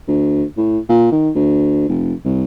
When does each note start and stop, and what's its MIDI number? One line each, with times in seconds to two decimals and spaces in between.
0.08 0.44 38
0.58 0.78 45
0.89 1.08 46
1.12 1.30 51
1.35 1.85 38
1.89 2.13 29
2.25 2.45 36